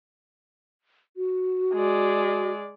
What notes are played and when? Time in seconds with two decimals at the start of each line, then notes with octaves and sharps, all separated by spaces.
1.17 F#4
1.74 G#3 D5